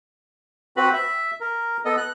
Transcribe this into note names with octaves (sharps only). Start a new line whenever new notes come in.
C4 F#4 B4 B5
E5
A#4
B3 A4 D#5
F#6